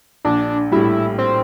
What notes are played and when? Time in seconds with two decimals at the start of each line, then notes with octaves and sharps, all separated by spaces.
0.25 A#1 D4
0.72 A2 G3 E4
1.18 C4